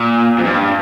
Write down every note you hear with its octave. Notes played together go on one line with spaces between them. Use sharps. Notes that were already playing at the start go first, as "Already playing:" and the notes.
Already playing: A#2
F2
G2